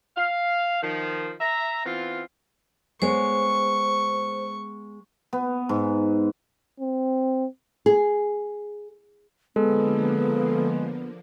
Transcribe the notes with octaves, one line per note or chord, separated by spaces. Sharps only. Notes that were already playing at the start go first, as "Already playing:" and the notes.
F5
D#3 F3
E5 A#5
E3 B3 C4 F4
G#3 B3 C5 C#5 C#6
B3
G#2
C4
G#4
D3 F3 G#3 A#3 B3 A4